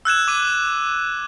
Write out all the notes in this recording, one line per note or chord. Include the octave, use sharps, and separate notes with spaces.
E6 F#6 G#6 E7
D6 D#7